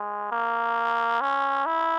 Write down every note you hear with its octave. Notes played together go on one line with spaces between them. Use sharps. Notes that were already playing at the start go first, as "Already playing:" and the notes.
Already playing: G#3
A#3
C#4
E4